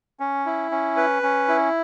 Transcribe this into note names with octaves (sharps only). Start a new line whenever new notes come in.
C#4
E4
C#4
B4
C#4
E4